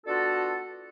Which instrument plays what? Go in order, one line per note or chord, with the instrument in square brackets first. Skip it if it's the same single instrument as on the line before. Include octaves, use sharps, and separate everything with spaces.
[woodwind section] B3 D4 F4 F#4 A4